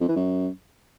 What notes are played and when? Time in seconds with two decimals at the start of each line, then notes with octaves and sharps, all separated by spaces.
0.01 F2
0.08 E3
0.16 F#2